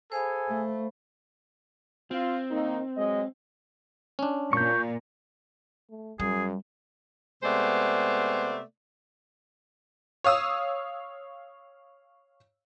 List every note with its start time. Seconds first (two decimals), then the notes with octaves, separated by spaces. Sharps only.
0.12 G#4 A4 C5 F5 G#5 B5
0.48 A3
2.11 C4 F4
2.51 D#3 A#3 D#4
2.97 F#3 G#3 D#5
4.19 C#4 D4
4.53 A#2 C#6 G6
5.90 A3
6.20 F#2 G3 G#4
7.43 C3 G#3 A3 B3 C5 D5
10.24 C#5 F5 D#6 E6